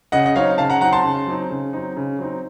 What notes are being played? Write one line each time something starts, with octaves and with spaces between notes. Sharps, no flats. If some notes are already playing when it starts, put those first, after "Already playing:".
C#3 D#5 F#5
D#5
F#3 C4 D#4 C#5 F5
C#3 F5 A5
F#5 A#5
F#3 C4 D#4 F#5 A#5
A5 C6
C#3
F#3 C4 D#4
C#3
F#3 C4 D#4
C#3
F#3 C4 D#4